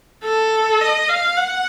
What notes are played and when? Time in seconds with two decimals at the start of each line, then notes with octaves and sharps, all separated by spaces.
0.24 A4
0.81 D#5
1.09 F5
1.37 F#5